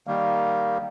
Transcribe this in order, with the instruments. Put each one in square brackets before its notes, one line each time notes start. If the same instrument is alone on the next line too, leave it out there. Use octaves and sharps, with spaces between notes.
[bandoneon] D#3 G3 A#3